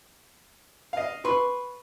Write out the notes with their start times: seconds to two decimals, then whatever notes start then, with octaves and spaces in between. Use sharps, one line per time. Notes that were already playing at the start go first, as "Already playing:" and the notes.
0.93 D#5 F5
1.25 B4 C6 C#6